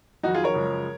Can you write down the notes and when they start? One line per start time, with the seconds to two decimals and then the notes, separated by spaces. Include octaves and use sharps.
0.23 F2 D#3 F#3 D#4 F#4
0.34 F4 G#4
0.44 A#4 C#5
0.54 F#2 C#3 F3 G#3